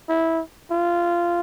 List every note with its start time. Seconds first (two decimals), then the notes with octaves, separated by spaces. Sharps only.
0.09 E4
0.71 F4